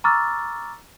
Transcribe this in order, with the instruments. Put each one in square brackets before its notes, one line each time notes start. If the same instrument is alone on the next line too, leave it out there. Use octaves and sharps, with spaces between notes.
[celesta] A#5 C#6 D6 E6 F6 A6